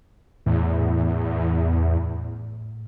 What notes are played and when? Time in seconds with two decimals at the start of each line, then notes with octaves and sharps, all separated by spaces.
0.46 E2 A2